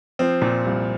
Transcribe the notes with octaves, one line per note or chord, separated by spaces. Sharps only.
F3 C4
A#2
C2